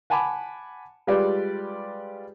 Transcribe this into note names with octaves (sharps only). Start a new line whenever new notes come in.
F#5 G#5 A5 B5 D6
G3 G#3 F4 G4 B4 D5